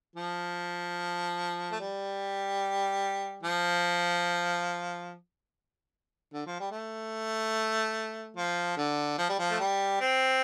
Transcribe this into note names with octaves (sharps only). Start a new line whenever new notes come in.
F3
A3
G3
F3
D3
F3
G3
A3
F3
D3
F3
G3
F3
A3
G3
C4